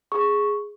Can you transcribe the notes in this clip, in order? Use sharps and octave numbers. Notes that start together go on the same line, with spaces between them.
G#4 C#6